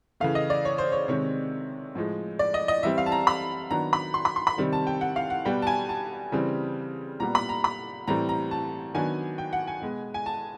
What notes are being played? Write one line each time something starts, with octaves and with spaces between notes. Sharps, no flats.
C#3 E3 A3 F5
D#5
D5
C#5
C5
C#5
C3 D#3 G#3 C4 C#5
A2 F3 G#3
D5
D#5
D#5
E3 G3 C4 E5
F5
A5
A#5
B5
D#3 F#3 B3 D4 A#5
B5
C6
B5
C6
B5
C3 D#3 G3 C4
A5
G5
F#5
F5
F#5
B2 G3 B3 G5
A5
G#5
A5
C#3 E3 G3 C4
A#2 G3 B3 A#5
B5
A#5
B5
A2 E3 G3 C4 A#5
A#5
A5
D#3 F#3 B3 D4 G#5
G5
F#5
G#5
B2 G#3 B3
G#5
A5